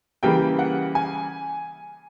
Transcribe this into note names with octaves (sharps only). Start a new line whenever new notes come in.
C#3 E3 G3 A#3 G5
F#5
G#5